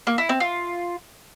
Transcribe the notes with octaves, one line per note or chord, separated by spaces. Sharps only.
A#3
E4
C4
F4